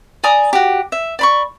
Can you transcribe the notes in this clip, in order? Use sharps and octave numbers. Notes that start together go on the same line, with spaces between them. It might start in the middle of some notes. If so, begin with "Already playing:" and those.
D5 G#5 A#5 D#6
F#4 G4
E5
D5 B5 C#6